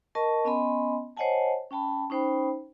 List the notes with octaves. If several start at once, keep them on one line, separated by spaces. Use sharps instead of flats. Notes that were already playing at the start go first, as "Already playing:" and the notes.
A#4 D#5 A5 C#6
B3 C#4 D#5 G#5 B5 C6
C5 C#5 D#5 F#5 G#5 A5
C#4 G5 A5 B5
C#4 D#4 C5 G5 B5